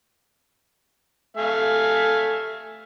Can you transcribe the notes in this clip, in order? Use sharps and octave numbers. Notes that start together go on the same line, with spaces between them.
A3 F5 G#5